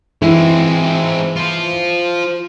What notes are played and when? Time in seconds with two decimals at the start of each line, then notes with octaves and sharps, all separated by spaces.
0.22 E3 G#3 C4 E4
1.36 F4 C5